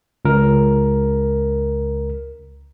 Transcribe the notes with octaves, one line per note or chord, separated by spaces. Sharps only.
C#2 A#4